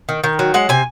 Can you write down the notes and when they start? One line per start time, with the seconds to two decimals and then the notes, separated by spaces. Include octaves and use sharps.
0.09 D#3
0.24 D#3
0.39 F#3
0.54 G#3 F#5
0.69 C3 G#5